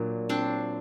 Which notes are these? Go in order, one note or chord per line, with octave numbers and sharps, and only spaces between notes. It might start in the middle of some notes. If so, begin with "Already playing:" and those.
Already playing: A#2 F#3 A#3 D4
C4 D4